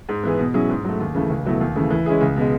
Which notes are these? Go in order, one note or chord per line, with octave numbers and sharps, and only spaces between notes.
G#2
E3 B3 E4 G#4
B2
F#3 C#4 E4 G#4
G#2
F#3 A3
D#2
C#3 E3 A3
C#2
B2 F#3 A3 E4
D#2
C#3 E3 A3
E3
G#3 C#4 E4 G#4
C#2
B2 G#3